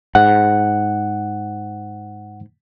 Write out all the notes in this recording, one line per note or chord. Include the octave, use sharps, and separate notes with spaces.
G#2 F#5